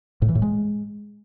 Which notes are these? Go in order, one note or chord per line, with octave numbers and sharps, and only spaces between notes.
A2
E3
A2
G#3